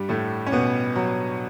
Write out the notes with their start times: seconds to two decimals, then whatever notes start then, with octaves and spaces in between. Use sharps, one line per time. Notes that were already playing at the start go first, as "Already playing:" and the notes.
Already playing: G2 G3
0.09 A2 A3
0.46 C#4
0.52 B2 B3
0.96 F#3